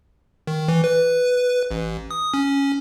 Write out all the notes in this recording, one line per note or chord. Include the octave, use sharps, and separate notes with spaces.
D#3
E3
B4
A1
D#6
C#4